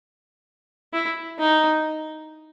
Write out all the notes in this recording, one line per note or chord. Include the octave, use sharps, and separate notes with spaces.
E4
D#4